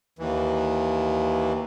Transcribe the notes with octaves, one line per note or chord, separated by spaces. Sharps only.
D#2 E3